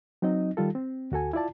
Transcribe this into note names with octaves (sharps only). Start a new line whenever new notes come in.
F#3 C4 D#4 D#5
D#3 G3 F4 A4
C4
D2 F#4 A4 G#5
E4 F4 D5 A5